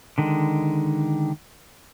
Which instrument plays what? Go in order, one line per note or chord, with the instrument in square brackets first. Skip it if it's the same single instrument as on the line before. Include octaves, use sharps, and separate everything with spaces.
[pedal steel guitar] D3 D#3 G#3